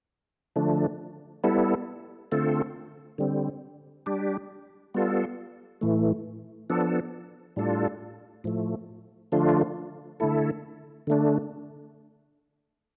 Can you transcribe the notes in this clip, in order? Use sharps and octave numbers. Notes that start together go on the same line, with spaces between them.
D3 F3 A3 D4
G3 B3 E4 A4
D3 A3 C4 F4 A4
D3 G3 C4
G3 D4 G4
G3 B3 F4 A4
A2 E3 A3
F3 B3 D4 A4
A2 G3 D4 F4 A4
A2 F3 A3
D3 F3 A3 D4 F4
D3 A3 E4 A4
D3 A3 D4